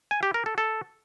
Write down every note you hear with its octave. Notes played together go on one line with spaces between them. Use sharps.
G#5
G4
A#4
A4
A4